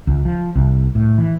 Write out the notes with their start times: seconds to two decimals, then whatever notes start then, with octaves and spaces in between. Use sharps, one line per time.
0.07 C#2
0.25 F3
0.55 C2
0.95 A2
1.18 E3